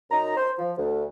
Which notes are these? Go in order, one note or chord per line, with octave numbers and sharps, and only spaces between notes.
F#2 D#4 A#5
C5
F3
D2